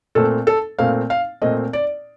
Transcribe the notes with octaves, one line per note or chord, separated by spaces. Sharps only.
A#2 A3 C4 A4
A4
A#2 A3 C4 F5
F5
A#2 A3 C4 D#5
D5